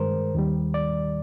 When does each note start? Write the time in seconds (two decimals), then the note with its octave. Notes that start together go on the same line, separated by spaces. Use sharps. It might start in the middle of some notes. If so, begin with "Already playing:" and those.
Already playing: G2 D#3 G#3 A#4 C5
0.35 D#2 D#3 G3
0.74 D5